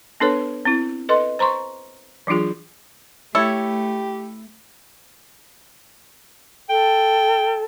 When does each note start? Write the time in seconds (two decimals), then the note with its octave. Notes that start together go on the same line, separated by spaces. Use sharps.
0.20 B3 D4 A4 B4 C#5
0.65 C4 E4
1.09 A4 B4 D#5 C6
1.39 C5 A#5 C6 C#6
2.27 E3 F#3 D4 F4 G#4
3.35 A3 E4 G4 A4 C#5
6.70 A4 G5